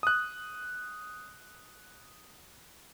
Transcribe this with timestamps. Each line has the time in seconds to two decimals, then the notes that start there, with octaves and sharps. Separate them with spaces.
0.03 D#6 F#6